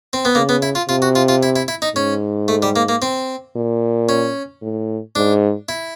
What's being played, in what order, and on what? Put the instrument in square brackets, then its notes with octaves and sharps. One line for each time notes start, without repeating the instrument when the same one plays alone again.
[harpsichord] C4
B3
[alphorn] C#3 [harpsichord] A#3
[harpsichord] B3
E4
F4
[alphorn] C3 [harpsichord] F4
[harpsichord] F#4
F4
F4
E4
E4
E4
D#4
[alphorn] G#2 [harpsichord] C#4
[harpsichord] A3
G3
A#3
A#3
C4
[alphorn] A#2
[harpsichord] C#4
[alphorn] A2
[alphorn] G#2 [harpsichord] D4
[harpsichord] E4